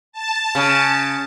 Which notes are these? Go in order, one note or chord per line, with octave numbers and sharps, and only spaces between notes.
A5
C#3